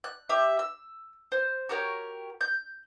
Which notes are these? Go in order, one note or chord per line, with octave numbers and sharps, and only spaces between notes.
F#6
G4 E5
E6
C5
F#4 G4 A#4 C#5
G6